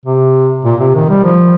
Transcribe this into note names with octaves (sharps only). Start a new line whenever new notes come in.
C3
A#2
C3
D#3
G3
F3